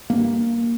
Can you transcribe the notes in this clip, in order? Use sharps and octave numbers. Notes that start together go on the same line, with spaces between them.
G2 A#3